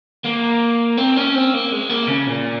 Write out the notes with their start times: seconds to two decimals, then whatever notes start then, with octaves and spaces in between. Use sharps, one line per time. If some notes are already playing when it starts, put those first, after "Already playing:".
0.25 A#3
0.97 C4
1.16 C#4
1.35 C4
1.54 A#3
1.72 G#3
1.89 A#3
2.08 C#3
2.27 A#2